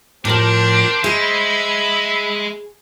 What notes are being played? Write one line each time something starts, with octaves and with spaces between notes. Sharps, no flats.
A2 F3 D4 G4 A#4 C5
G#3 G#4 E5 B5